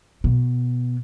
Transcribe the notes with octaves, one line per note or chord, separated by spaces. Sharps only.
B2